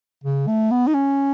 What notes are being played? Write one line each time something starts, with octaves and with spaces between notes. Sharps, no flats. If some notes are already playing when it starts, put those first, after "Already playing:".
C#3
A3
B3
D#4
C#4